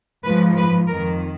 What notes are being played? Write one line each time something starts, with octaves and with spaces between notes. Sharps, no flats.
G#2 F3 B4
B4
F2 D#3 A#4